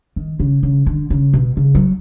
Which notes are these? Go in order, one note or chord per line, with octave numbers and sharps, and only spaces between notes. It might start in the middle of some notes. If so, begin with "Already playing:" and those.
D#3
C#3
C#3
D3
C#3
B2
C#3
F#3